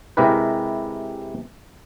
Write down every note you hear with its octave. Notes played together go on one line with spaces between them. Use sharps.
C3 G#3 E4 G4 A#4 B4